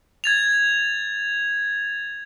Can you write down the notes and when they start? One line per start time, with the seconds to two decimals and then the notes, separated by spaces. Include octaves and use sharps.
0.24 G#6 A6 F7